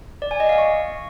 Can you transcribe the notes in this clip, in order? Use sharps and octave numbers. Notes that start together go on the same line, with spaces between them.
D5
G#5
D#5
F5
C#6